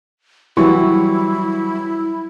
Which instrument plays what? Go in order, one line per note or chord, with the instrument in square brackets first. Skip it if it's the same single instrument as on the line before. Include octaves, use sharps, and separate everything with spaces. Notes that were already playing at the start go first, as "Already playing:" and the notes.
[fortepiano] E3 [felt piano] F#3 G3 C#6 [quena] E4